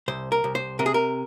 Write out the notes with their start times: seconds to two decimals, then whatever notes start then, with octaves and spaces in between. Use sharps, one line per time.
0.08 C2 C5
0.32 A#4
0.44 C2
0.55 C5
0.79 C3 A#4
0.86 G#4
0.94 A#4